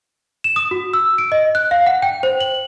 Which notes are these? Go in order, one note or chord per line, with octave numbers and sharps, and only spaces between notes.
E7
D#6
F#4
E6
D7
D#5
F#6
F5
F#5
G5
C5
F#7